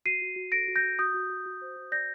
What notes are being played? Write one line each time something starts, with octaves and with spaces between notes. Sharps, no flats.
F#4 C7 D#7
F#4
F#4
A4 A#6 D7
F#4
G6 A#6
F#4
F#4 D#6 G6
F#4
F#4
F#4
C5
F#4
D5 G6 A#6